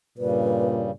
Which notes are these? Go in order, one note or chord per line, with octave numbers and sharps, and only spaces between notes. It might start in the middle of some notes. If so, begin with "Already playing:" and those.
G2 A#2 C#3 G3 B4